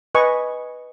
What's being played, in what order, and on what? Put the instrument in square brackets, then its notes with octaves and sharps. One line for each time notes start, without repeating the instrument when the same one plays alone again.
[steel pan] B4 D#5 G#5 C#6